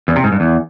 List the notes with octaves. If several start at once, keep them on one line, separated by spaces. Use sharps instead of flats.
E2
C3
G#2
G2
E2